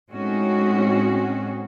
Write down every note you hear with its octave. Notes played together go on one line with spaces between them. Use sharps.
A2 G#3 C4 C#4 D#4 F#4